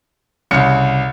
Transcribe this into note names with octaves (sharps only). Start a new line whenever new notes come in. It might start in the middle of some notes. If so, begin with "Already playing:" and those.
C2 C#3 C#7